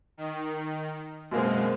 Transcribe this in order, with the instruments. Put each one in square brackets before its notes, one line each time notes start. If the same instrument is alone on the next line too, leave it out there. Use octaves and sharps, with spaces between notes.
[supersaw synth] D#3
[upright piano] F#2 A#3 C4 [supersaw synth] B2 G#3